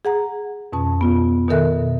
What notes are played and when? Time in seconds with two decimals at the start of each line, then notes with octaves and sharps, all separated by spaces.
0.05 G#4 F#5 A#5
0.73 F2 B2 C#4 A5
1.01 B3 F4
1.48 B2 D#3 A4 A#4 E5 F#6